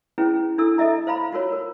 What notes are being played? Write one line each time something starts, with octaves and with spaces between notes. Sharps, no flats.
C#4 E4 G#4 B4
D4 E4 A4 E6
A4 D#5 E5 A#5
C5 F5 A#5 B5
F4 F#4 A#4 C#5
A#4